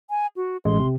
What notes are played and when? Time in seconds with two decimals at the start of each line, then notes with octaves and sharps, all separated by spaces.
0.10 G#5
0.37 F#4
0.65 A1 G#3 C6
0.80 C3